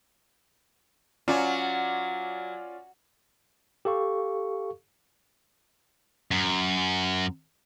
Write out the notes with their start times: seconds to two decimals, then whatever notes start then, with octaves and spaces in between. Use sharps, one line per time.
1.28 F#3 C#4 F4 D5
3.85 G4 A4 F5 C#6
6.31 F#2